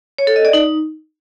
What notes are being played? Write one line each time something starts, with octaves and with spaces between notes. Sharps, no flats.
C#5
A4
D#5
D5
D#4